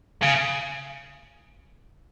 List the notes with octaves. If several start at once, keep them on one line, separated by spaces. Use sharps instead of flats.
C#3